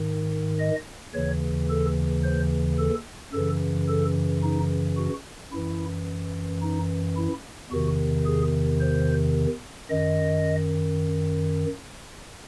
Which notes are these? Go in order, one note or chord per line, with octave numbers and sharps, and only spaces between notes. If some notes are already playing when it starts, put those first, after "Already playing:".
Already playing: G#2 D#3
D#5
D#2 C#3 E3 C#5
A4
C5
A4
F#2 C#3 E3 A4
A4
D#4
F#4
F#2 E3 E4
D#4
E4
E2 C3 D#3 F#4
G#4
C5
F#2 D#3 D#5